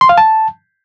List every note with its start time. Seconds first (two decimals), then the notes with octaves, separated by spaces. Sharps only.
0.01 C6
0.09 F5
0.18 A5